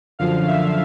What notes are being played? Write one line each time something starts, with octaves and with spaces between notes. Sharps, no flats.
F#2 D3 F3 F5
E5